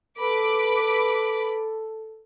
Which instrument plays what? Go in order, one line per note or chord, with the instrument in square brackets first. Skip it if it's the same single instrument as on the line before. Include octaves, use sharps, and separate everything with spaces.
[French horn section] A4 [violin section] B4 B5 D6